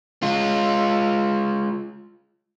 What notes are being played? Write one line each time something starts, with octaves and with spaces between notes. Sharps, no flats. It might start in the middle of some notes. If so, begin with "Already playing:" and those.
G#3 F4